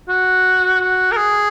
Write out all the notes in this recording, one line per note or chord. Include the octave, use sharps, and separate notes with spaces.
F#4
F#4
A#4
G#4